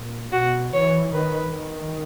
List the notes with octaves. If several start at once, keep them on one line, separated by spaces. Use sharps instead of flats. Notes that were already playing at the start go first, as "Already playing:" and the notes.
Already playing: A#2
B2 F#4
E3 C#5
D#3 B4
D#3